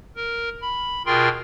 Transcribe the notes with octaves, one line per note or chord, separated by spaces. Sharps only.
A#4
B5
B2 F4 G#4 A#4 G5 C6